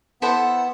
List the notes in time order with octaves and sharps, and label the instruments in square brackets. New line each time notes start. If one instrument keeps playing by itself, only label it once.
[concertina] B3 [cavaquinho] E4 A4 C5 F#5